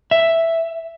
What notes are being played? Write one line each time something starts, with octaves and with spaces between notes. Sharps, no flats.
E5